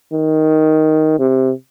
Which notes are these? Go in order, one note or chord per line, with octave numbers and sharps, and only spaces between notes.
D#3
C3